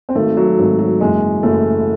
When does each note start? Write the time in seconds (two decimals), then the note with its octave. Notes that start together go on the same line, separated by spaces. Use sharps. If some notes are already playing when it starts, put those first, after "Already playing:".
0.09 C4
0.15 G#1 G#2 D#3 A3
0.37 F#3
0.58 G#1 G#2 D#3
0.79 F#3
1.00 F#1 F#2 E3 G#3
1.43 F#1 F#2 E3 A3